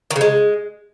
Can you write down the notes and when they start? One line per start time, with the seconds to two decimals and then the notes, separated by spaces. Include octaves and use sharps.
0.11 D#3
0.16 C#3
0.21 G#3